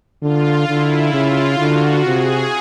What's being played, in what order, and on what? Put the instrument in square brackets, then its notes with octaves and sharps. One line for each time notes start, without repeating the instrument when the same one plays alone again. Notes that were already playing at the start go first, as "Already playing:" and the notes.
[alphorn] D3 [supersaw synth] F4
[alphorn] D3 [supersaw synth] E4
[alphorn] C#3 [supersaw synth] F4
[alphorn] D3 [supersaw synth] F#4
[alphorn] C3 [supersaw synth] G#4